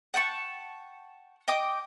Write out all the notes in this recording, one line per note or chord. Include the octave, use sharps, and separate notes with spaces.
F#5 G5 A5 C#6
D#5 G5 D6 D#6